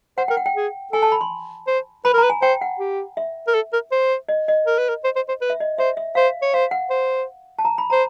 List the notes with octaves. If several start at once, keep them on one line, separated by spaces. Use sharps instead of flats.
C5 F#5
A#4 G5
F#5
G5
G#4
A4 G#5
A5
B5
C6
C5
B4 B5
A#4 A#5
B4
G#5
C5 G5
F#5
G4
E5
A#4
A4
A#4
C5
D#5
D#5
A#4
B4
A#4
C5
C5
C5
B4
E5
D#5
C5 E5
E5
C5 F5
C#5
C5 F5
F#5
C5
A5
A#5
B5
C5 A#5